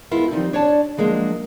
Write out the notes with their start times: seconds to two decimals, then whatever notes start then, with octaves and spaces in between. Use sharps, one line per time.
0.11 G#3 B3 E4 F4 A#4
0.31 F3 G3 C4 D#4
0.53 D4 C#5 D5 A5
0.97 F3 F#3 G#3 A#3 D4